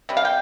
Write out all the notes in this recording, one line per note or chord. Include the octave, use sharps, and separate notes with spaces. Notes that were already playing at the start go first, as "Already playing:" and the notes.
C3 G3
F5
G5